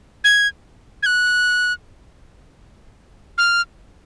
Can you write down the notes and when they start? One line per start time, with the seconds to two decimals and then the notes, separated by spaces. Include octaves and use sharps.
0.24 G#6
1.03 G#6
1.06 F#6
3.38 F6